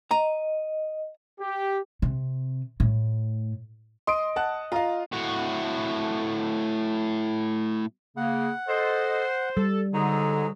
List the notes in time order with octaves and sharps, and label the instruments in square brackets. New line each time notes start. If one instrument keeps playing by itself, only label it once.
[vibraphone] D#5 [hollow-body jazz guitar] A#5
[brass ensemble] G4
[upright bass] C3
A2
[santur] D#5 [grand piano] C6 D7
[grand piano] F#5 A5 F#6
[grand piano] F4 D#5 F5 [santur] A#5
[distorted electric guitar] A2 F#4
[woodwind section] C#3 A#3 [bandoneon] F#5
[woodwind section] A4 D#5 [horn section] C5
[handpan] G3 [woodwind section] A4
[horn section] G#2 F#3 G#4 [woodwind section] D3 [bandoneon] D#4